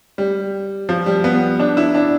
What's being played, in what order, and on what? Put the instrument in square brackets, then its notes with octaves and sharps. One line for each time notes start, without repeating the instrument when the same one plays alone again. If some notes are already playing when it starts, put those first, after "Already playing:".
[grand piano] G3
F3
G3
B3
D4
E4
D4